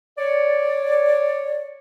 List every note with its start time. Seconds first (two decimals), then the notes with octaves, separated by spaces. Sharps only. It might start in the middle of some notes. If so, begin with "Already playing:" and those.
0.19 C#5 D5